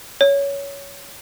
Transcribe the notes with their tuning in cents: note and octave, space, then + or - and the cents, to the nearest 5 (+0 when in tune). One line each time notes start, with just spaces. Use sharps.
C#5 +15